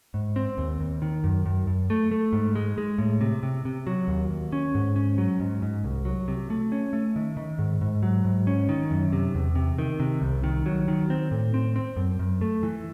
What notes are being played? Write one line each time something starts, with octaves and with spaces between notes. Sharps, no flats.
G#2
C4
D#2
D#2
D#3
F#2
F#2
F#2
A3
A3
G#2
G#3
G#3
A2
C3
C3
C3
F#3
D#2
D#2
C#4
G#2
C#4
F#3
G#2
G#2
C2
F#3
C3
A3
C#4
A3
D#3
D#3
G#2
G#2
F#3
G#2
C#4
D#3
F#2
C3
E2
C3
D#3
C3
C2
D#3
F#3
D#3
C4
A2
C4
C4
F#2
F#2
A3
E3